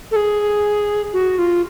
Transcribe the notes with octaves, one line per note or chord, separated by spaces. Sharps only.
A4
G#4
F#4
F4